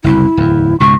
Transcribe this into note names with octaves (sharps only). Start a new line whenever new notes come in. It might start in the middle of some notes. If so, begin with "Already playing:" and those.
F#1 C2 F#2 E4
D1 E2
C#2 G#2 B2 C#6